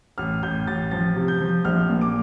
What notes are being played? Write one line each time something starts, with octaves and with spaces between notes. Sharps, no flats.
A1 F6
A1 G6
A1 A6
F3 A6
C3
G6
F3
A#1 F6
A#2
D6